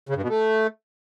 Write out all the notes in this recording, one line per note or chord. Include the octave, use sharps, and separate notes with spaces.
C#3
G2
B2
A3